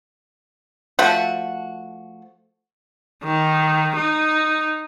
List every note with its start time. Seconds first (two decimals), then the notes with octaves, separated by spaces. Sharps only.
0.99 F3 A3 F#4
3.23 D#3
3.96 D#4